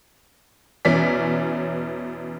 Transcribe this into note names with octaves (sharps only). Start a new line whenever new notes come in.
E2 B2 E3 C#4 D5 B6